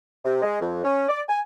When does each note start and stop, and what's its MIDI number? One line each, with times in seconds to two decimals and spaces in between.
0.24 0.40 48
0.42 0.58 56
0.61 0.82 41
0.83 1.03 61
1.09 1.20 74
1.28 1.39 80